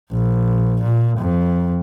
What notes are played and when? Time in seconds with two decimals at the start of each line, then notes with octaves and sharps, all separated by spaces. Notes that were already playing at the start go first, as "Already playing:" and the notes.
0.12 A#1
0.83 A#2
1.18 F2